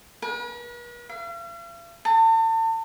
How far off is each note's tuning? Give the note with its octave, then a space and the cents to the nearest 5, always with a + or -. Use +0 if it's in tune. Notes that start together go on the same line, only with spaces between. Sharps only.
B4 -45
F5 -45
A5 +40